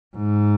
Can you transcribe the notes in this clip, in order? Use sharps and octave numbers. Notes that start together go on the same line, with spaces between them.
G#2